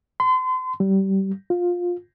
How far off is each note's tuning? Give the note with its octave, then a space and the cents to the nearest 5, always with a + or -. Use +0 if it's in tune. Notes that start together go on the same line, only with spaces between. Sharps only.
C6 -35
G3 -25
F4 +15